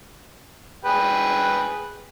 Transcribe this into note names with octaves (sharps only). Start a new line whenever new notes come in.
G#4 B4 G5